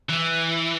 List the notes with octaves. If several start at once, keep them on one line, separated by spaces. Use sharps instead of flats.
E3